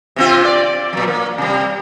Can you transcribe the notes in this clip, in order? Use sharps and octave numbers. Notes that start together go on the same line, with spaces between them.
C3 C4 F4
D5
A#2 F#3
A#3
C3 G3